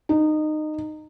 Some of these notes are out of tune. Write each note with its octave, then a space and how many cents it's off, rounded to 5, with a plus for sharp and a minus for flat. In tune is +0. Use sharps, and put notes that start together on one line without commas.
D#4 -20